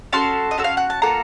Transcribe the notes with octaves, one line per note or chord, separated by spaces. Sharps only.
C#4 F#4 A4 A5 C6
D#5
C#4 F#4 A4
F5
F#5
A5
A#3 F4 A4 F#5 A#5